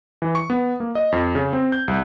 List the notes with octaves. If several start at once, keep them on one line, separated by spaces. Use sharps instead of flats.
E3
C#6
B3
A#3
D#5
F2
C#3
C4
G6
C2